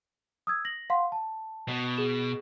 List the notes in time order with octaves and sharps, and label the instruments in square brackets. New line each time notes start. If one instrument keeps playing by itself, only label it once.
[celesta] D#6 E6 G#6
A#6 F#7
F5 F#5 C6
A5
[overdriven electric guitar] B2
[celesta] G#4 E7